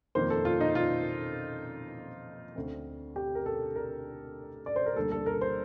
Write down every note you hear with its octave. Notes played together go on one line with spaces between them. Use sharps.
F2 D#3 A#3 C5
A4
F4
D#4
F4
D2 D3 A3 C4
G4
A#4
A4
A#4
D5
C5
A#4
D2 D3 G3 A#3 A4
A4
A#4
C5